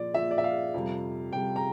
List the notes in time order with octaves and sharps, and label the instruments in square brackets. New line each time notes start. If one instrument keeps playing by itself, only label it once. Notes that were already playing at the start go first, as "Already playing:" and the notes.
Already playing: [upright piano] A#2 F3 D5
A#2 F3 E5
D5
E5
F5
F2 C3 G3
F2 C3 G3 G5
A#5